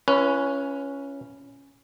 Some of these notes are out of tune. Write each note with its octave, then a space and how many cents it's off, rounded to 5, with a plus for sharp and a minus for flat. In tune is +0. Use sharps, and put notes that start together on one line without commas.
C#4 +0 E4 +40 B4 -20